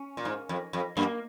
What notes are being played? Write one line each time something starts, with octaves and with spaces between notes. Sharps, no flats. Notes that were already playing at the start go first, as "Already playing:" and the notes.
Already playing: C#4
A#2
G#2
F2
F2
F#2 A#3